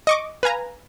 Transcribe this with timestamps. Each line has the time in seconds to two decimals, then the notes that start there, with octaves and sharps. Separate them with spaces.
0.07 D#5 C#6 D6
0.43 B4 F5 G#5 A#5